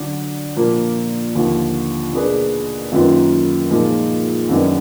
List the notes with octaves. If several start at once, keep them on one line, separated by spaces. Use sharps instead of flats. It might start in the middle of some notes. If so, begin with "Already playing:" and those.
Already playing: D3 F#3 D4 F#4
A#2 F3 A#3 D4
D#2 D3 F3
B2 A#3 D4 G#4 B4
F#2 D#3 A#3 F4 B4
A#2 F3 G#3 D#4 A#4
F#2 D#3 G#3 B3 D4